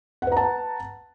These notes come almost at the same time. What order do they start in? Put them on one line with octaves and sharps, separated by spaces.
F#5 B4 A#5 A5